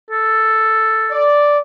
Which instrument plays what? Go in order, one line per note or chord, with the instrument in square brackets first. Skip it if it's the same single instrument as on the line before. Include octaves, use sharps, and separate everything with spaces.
[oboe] A4
[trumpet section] D5